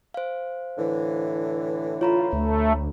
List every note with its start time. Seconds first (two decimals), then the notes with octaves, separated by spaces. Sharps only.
0.14 C5 F5
0.78 A2 D3 E3
2.01 F4 C#5 A#5 B5
2.33 D2 A3